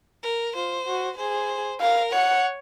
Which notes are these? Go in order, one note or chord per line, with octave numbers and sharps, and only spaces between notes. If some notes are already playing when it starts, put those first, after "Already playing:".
A#4
F4 C5
F#4
G#4 C5
A#4 F5
C#5 F#5